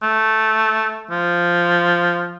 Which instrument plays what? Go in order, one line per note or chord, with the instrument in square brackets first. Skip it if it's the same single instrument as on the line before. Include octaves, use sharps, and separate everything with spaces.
[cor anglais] A3
F3